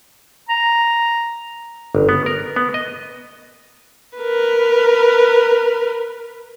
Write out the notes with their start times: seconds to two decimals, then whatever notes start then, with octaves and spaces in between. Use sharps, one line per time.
0.49 A#5
1.95 G1
2.09 B3
2.26 A#4
2.56 B3
2.74 D#5
4.17 A#4 B4